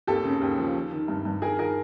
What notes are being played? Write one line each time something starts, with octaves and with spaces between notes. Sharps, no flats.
D#2 G4 A4
C#3
D#2
F3
D#3
D#3
G2
G2
D#3 G#4 A#4
D#3 G#4 A#4